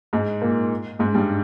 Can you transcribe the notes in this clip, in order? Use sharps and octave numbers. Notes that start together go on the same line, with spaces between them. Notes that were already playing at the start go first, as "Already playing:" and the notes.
G#2 G#3
A#2 A#3
G#2 G#3
G2 G3